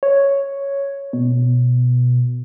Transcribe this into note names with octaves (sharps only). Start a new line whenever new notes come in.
C#5
B2